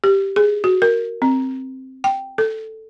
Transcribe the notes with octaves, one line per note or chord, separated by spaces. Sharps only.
G4
G#4
F#4
A#4
C4
G5
A4